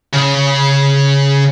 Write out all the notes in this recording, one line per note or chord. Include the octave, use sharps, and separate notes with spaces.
C#3